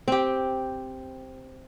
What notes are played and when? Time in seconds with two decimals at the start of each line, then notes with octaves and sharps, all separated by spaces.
0.08 C4 G4